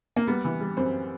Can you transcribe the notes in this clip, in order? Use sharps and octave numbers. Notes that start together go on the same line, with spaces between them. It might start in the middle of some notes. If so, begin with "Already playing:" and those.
A#3
G3 B3
E3
G3
F#2 C4